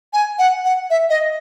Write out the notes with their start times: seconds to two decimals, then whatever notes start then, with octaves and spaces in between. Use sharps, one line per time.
0.13 G#5
0.39 F#5
0.65 F#5
0.90 E5
1.10 D#5